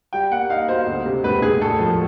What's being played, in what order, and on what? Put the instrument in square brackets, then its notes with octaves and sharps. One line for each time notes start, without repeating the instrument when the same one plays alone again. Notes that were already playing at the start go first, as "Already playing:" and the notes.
[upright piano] G3 [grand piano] G5
[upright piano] A#3 [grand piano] F#5
[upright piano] D#4 [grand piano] F5
[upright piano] B2 [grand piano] C5
[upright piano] D2
C3
[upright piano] E1 [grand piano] B4
[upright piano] E1 [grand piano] G#4
[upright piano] A2 [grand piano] A4
[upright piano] F3